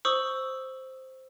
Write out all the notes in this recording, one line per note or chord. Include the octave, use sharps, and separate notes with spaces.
C5 C#6 D#6 E6 F#7